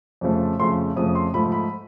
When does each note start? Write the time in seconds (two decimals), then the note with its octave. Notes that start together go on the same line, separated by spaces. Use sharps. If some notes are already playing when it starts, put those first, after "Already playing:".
0.21 F2 C#3 F3 A3
0.59 F2 C#3 F3 A3 C6
0.96 F2 C#3 F3 A3 D#6
1.15 C6
1.34 G#2 F3 A3 B5
1.52 B5